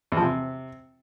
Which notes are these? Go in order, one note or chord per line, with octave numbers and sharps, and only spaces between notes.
E2
F3
C3